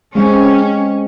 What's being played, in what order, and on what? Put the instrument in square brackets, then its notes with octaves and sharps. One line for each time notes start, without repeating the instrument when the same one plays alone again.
[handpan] G#3 C4 [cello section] C#4